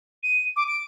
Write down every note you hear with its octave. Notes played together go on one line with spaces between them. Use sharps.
D#7
D6
D7